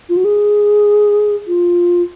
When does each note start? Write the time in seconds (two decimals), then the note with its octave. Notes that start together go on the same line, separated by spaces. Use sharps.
0.09 F4
0.17 F#4
0.25 G#4
1.47 F4